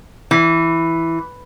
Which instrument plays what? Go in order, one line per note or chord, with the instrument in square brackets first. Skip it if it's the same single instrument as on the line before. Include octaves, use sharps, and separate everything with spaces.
[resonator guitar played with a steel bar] E3